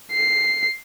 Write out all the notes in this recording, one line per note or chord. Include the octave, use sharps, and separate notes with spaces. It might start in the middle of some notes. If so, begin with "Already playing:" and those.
C7